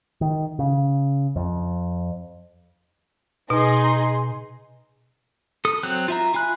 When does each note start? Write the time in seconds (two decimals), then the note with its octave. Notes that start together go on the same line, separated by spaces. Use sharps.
0.21 D#3
0.59 C#3
1.36 F2
3.50 B2 D#4 G#4 C6
5.65 A4 D#6
5.83 F#3 C4 F#6
6.08 F4 E5 A#5
6.34 F4 G#5 B5 F#6